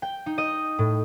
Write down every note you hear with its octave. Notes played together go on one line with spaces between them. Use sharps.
G5
D#4
D#5
A2